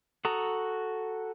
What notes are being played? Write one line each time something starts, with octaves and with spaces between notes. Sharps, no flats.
F#4 A4 A#5 D#6